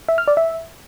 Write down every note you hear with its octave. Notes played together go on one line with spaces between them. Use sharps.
E5
F6
D5
E5